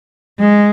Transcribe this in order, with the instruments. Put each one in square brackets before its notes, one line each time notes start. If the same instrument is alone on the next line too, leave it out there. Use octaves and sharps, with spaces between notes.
[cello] G#3